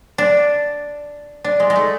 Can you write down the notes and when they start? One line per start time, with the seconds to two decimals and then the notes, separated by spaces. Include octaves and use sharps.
0.18 D4
1.44 D4
1.60 G#3
1.70 G#3
1.76 A3